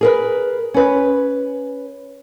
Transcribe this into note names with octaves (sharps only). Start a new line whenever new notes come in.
G#4 A#4 B4
C#4 B4